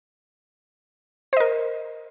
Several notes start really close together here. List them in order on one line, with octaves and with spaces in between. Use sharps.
C5 D#5 A#4